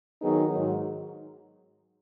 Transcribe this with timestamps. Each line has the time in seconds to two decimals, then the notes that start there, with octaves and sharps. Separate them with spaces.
0.21 D#3 F#3 B3 D#4 G#4
0.49 G#2 D#3 F#3